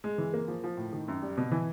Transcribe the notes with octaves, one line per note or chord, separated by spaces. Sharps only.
G#3
E3
A#3
F3
F3
A2
D#3
F#2
G3
B2
E3